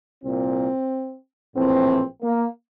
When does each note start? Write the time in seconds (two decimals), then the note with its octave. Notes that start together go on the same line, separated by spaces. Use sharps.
0.21 C2 A#2 C4
1.55 A#1 A2 E3 C4
2.22 A#3